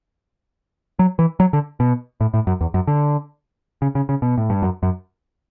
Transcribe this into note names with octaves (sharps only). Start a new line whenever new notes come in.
F#3
E3
F#3
D3
B2
A2
A2
F#2
E2
F#2
D3
C#3
C#3
C#3
B2
A2
G2
F#2
F#2